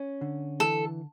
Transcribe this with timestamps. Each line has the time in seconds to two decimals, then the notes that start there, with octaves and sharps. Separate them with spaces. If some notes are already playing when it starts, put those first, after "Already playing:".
Already playing: C#4
0.21 D3
0.60 E3 A4